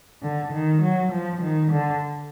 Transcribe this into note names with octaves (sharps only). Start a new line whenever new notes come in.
D3
D#3
F#3
F3
D#3
D3